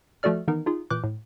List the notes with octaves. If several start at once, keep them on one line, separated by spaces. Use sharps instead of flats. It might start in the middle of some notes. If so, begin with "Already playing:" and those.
F3 A3 F#4 A4 D5 F6
D#3 E3 B3 D#4 A#4
D#4 F4 G#4
A#2 E3 D6 F#6 G6
A2